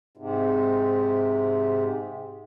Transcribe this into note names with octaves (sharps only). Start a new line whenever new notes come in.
G#2 C3